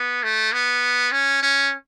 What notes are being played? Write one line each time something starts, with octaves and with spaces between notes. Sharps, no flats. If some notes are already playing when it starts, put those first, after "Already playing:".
Already playing: B3
A3
B3
C#4
C#4